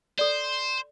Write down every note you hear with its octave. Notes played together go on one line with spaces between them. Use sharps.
A4 C5 D5